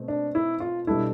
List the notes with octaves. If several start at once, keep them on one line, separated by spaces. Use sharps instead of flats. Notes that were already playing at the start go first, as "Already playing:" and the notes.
Already playing: B2 A3 C4
D4
E4
F4
B2 G3 D4 E4 A4